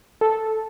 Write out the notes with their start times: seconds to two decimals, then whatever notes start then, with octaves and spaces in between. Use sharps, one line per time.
0.21 A4